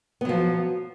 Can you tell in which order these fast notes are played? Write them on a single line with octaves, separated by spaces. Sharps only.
B3 F#3 F3